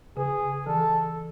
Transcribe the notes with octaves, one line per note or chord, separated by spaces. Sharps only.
C#3 G#4
E3 A4